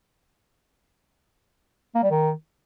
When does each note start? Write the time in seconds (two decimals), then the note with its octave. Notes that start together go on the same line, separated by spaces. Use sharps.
1.95 A#3
2.03 G3
2.11 D#3